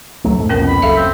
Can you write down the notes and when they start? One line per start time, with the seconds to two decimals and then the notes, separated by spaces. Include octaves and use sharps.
0.24 C#2 F#3 A3
0.38 F2 G#2 A3
0.49 C2 F2 B2 A#3 C#4 A#4
0.68 B5
0.82 F#1 C#2 A4 E5 F5
0.96 C4